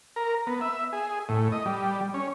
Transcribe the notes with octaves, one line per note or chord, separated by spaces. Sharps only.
A#4
B3
E5
G#4
A2
D#5
G3
C#4